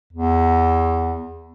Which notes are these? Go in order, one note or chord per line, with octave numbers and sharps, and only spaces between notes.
E2